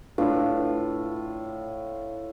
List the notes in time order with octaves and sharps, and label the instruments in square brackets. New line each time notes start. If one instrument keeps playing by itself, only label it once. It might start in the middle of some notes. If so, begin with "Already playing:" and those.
[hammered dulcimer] A2 [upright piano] D4 F4 B4